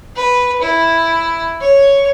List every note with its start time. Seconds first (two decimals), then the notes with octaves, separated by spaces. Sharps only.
0.16 B4
0.62 E4
1.61 C#5